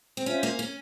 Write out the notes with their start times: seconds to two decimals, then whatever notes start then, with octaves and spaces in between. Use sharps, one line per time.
0.17 C4
0.26 C#4 F4 C5 E5 G#5
0.43 A#3
0.59 C#4